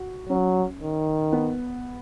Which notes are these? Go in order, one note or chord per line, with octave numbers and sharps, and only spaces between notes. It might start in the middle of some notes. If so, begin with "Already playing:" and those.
Already playing: F#4
F#3 C#4
D#3
B3